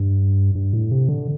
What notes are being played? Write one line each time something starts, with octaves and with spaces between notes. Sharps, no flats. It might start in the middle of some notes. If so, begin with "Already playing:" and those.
Already playing: G2
G2
A2
C3
D3